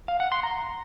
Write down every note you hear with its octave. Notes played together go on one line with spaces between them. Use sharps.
F5
F#5
C6
A#5